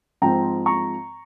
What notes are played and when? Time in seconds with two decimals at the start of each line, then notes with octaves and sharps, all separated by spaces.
0.22 G#2 F3 C4 G5 A#5
0.66 A#5 C#6